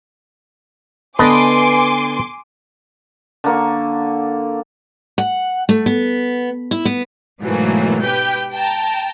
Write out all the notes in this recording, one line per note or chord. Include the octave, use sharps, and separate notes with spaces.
D3 B3 B4 D#5 G#5 A5 C6 D6
D3 A#3 C#6
F#5
A3
B3
E4
B3
G#2 B2 E3 F#3 A3 A#3
G4 B4 G5 G6
G5 A5 A#5